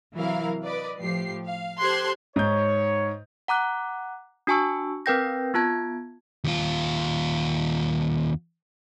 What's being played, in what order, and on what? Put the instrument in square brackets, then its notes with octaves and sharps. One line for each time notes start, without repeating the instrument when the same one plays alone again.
[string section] C3 E3 F#3 E4 A#4 F5
B4 D5 D#5
A2 F3 G4 C7
F5
G4 A4 C5 C6 F#6 G#6
[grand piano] G#2 G6 [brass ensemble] C#5
[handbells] F#5 A#5 D6 F#6
D4 F#4 G#5 A5 C#6 E6
C4 A#4 B4 G5 G6 A#6
B3 F4 A5 G#6
[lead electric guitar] D#2 F4